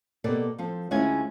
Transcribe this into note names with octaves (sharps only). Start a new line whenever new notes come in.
B2 A#3 G4 A4 D5
F3 C4 A4
D2 G#3 C#4 E4 F4 G#5